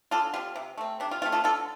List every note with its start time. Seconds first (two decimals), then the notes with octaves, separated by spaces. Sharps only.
0.11 D3 F4 A4
0.34 G3 C4 F4
0.56 C3
0.78 A3 C4
1.00 C3 D4
1.11 F4
1.22 C4 F4
1.26 A3
1.32 F4 A4
1.44 D3 F4 A4